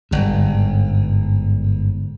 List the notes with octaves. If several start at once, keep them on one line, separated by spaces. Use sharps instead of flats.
G1 G#2